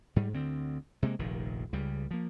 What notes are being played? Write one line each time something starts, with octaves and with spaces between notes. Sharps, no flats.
G#2 G3
D2 D3 C4
C3 G#3 A#3
F1 A#1 A#2 D#3
C#2 C#3 G3
F3 A#3